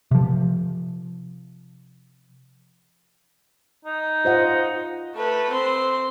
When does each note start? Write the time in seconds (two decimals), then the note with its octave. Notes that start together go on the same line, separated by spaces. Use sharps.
0.11 C3 F3
3.85 D#4
4.25 F4 C5 D#5 F#5
5.15 A3 B4
5.50 C4 C6